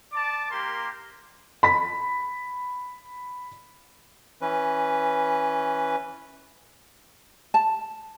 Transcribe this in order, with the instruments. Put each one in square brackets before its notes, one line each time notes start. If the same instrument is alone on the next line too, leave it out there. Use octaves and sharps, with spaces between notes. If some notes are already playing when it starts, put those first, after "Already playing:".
[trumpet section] D5 A5 D6
A#3 G4 A#4 C6
[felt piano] B5 B6
[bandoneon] E3 C#4 B4
[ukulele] A5